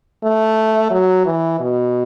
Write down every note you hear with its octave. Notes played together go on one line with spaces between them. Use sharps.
A3
F#3
E3
B2